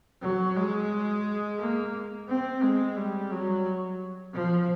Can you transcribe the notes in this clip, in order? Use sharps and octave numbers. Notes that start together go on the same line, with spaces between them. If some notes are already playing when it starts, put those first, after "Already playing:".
F#3
G#3
A#3
C4
G#3
G3
F#3
F3